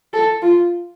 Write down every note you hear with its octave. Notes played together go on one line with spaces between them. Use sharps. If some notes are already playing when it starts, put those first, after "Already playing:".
A4
F4